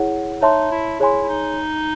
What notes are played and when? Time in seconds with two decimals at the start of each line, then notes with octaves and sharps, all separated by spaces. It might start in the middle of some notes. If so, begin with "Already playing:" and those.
Already playing: E4 G#4 C#5 F#5
0.41 D#4 C#5 E5 A5 C6
0.71 E4
1.00 E4 G#4 C#5 G#5 C6
1.23 E4
1.28 D#4